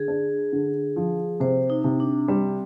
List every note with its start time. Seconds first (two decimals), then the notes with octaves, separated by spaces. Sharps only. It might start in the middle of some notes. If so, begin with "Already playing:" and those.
Already playing: D3 G#4
0.08 D4
0.53 D3
0.96 F3
1.40 C3 C5
1.70 D#4
1.84 C3
2.00 D4
2.28 G3 C4